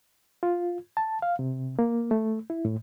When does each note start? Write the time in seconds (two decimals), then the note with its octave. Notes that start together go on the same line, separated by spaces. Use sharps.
0.43 F4
0.97 A5
1.22 F5
1.39 C3
1.79 A#3
2.11 A3
2.50 E4
2.65 A2